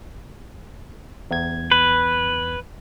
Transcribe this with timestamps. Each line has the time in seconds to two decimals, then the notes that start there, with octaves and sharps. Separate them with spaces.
1.31 E2 G#6
1.72 B4